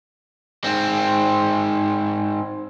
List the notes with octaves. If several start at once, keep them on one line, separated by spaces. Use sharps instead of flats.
G#2 C4